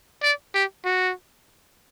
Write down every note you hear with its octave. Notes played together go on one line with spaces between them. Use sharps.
D5
G4
F#4